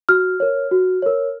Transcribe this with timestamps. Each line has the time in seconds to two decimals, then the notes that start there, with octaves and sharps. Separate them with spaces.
0.09 F#4 F6
0.40 A#4 C#5
0.71 F#4
1.02 A#4 C#5